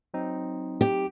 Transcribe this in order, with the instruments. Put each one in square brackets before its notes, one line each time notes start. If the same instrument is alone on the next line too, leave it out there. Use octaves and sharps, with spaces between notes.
[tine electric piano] F#3 C4 D#4
[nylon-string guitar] G4